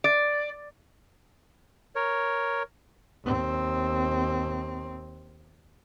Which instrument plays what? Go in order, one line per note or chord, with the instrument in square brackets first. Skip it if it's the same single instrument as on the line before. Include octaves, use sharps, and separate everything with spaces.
[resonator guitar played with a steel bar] D5
[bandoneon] A#4 C#5
[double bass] D#2 C4